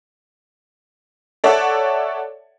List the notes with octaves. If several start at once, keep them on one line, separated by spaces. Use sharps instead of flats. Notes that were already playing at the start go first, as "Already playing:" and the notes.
A4 C#5 D5 E5 F#5 A5